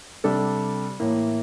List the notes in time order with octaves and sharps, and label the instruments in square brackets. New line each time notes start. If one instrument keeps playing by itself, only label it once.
[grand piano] C3 G3 D4 A4
A2 E3 A#3